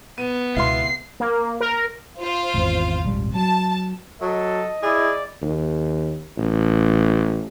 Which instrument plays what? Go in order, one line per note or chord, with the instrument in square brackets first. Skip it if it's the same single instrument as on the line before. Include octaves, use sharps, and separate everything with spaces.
[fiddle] B3 [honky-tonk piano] D#7
[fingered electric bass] C#2 B2 [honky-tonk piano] E4 F5 C6 [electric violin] C7
[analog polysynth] A#3
A#4
[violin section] F4 C5 F5
[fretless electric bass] G#1 E2
D#1 G#1 G3
[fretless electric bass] F#3 [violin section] A5
[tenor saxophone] F#3 [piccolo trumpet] A4 [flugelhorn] D#5
[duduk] E4 [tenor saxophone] G#4 [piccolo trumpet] D5
[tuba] D#2
A1